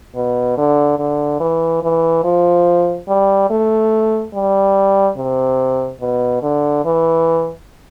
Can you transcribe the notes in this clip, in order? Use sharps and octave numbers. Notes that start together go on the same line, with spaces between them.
B2
D3
D3
E3
E3
F3
G3
A3
G3
C3
B2
D3
E3